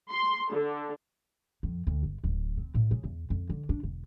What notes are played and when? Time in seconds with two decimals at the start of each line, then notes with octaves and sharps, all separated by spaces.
0.11 C6
0.51 D3
1.63 F2
1.87 D2
2.03 G1
2.24 D1
2.57 C4
2.74 A2
2.91 C#3
3.04 E2
3.30 F2
3.50 D3
3.69 D4
3.83 E1